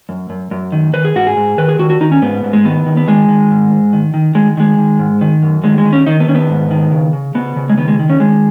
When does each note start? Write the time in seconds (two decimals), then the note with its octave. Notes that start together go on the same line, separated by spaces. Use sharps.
0.09 F#2
0.30 F#2
0.51 F#2
0.72 D#3
0.93 D#3 B4
1.05 G#4
1.15 G#2 F#4
1.27 G#4
1.37 G#2
1.58 D#3 B4
1.68 G#4
1.79 D#3 F#4
1.90 F#4
2.00 D#3 D#4
2.12 C#4
2.22 G#2 B3
2.44 G#2
2.53 G#3
2.65 D#3 B3
2.86 D#3
2.97 B3
3.07 D#3 G#3
3.28 D#3
3.51 G#2
3.72 G#2
3.93 D#3
4.14 D#3
4.35 D#3 G#3
4.57 D#3 G#3
4.79 D#3
4.99 G#2
5.21 D#3
5.43 F#2
5.64 D#3 G#3
5.78 G#3
5.85 D#3
5.93 C#4
6.06 D#3 D#4
6.20 B3
6.28 D#3 C#4
6.35 B3
6.49 G#2
6.71 D#3
6.92 C#3
7.13 C#3
7.35 C#3 B3
7.56 C#3
7.70 G#3
7.77 D#3 B3
7.88 G#3
7.99 D#3
8.10 C#4
8.20 D#3 G#3